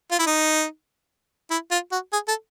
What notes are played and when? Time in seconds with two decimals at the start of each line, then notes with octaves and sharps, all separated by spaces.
0.12 F4
0.19 E4
0.27 D#4
1.51 E4
1.71 F4
1.92 F#4
2.13 G#4
2.28 A4